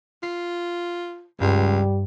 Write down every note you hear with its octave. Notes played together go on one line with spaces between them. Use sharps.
F4 C7
C#2 G2 G3